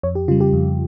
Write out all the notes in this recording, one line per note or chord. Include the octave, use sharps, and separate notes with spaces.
F2 C#5
G4
C#3 G3 F4
G4
F2